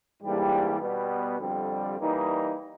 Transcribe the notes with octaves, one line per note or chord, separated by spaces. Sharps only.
G#2 E3 G3 A#3 D4
B2 G3 B3
F2 D3 G3
E3 G3 A#3 D#4